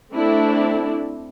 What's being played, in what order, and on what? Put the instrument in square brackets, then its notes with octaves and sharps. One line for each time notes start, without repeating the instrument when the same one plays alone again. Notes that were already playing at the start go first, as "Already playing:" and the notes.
[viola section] A3 C4 D4 E4